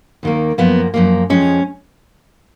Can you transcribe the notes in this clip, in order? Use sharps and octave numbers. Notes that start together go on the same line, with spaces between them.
D#2 D#3 A#3
F#2 F3 A#3 B3
F#2 F3 A#3
F2 F3 G#3 C#4